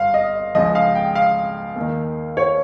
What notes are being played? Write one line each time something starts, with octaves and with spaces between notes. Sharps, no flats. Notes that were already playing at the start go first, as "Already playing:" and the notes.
Already playing: G1 G2 F5
D#5
C#2 C#3 F3 D#5
F5
G5
F5
D#2 D#3
C#5